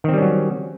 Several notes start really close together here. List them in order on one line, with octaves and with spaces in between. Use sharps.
D#3 C4 G3 C#4 F#3